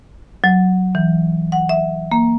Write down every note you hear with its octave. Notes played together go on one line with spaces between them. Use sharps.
F#3
E3
F#5
E5
A#3